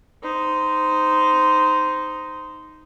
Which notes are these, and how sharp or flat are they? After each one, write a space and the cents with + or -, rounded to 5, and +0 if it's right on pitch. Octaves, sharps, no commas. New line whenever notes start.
D#4 +0 C5 -15